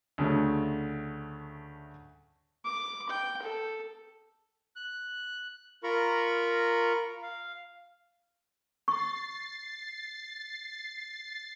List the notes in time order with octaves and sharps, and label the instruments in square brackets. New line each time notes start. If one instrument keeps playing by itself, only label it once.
[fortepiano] D2 C#3 A3
[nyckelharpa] D6
G5
A4
[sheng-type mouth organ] F#6
F4 A#4 A#5 B5 C#6
F5
[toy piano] C#6 [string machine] A6 C7